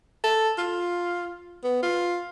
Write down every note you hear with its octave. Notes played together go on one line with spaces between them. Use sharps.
A4
F4
B3
F4